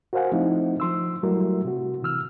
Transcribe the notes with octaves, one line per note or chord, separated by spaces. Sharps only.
F#4 A#4 C5 F5 F#5 G#5
F3 A3 C4 D#4 E4
F3 C6 E6
F#3 G3 A3 E4 F#4 A#4
C3 F#4
C3 E3 E6 F6